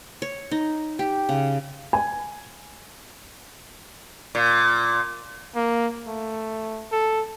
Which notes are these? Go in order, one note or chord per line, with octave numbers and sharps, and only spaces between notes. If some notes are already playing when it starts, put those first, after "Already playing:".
C#5
D#4
G4
C#3
G#5
A#2
A#3
A3
A4